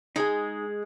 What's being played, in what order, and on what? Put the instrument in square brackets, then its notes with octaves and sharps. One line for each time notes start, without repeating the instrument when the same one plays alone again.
[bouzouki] G#3 [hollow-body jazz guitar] D#4 G#4